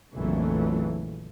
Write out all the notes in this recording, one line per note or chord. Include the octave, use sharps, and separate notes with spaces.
A#1 F2 C#3 E3 F#3 A3